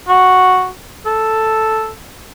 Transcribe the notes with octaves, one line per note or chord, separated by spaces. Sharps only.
F#4
A4